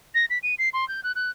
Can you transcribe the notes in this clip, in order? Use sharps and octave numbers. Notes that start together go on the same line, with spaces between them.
A#6
B6
D#7
C7
C6
G6
F#6
F#6